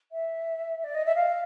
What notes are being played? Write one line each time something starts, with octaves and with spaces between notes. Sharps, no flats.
E5
D5
D#5
E5
F5